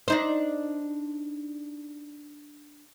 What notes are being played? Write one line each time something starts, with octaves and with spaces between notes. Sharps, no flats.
D4 D#4 C5